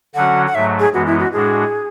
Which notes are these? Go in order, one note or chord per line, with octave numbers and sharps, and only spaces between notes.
D3 F#3 C#4 F#4 F#5
F#5
G#2 F#3 A3 E5
G#4
F#2 E3 G#3 B3 F#4
E4
F#4
A2 G#3 D4 F#4 G#4